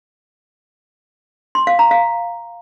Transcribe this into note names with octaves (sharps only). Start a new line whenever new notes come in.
C6
F5
A#5
F5